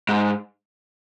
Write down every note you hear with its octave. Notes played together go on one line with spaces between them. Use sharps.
G#2